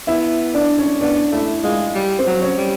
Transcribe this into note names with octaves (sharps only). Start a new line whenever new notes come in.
B3 E4 E5
D4 D5
C#4 C#5
B3 D4 D5
A3 E4 E5
G#3 F4 F5
G3
C4 C5
F#3
C#4 C#5
G3